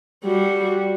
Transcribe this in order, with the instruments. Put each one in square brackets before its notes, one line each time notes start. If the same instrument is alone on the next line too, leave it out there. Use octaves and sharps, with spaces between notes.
[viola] G3 F#4